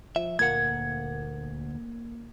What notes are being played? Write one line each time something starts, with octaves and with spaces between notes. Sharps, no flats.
F3 E5
D2 A#2 A#3 F#5 G#6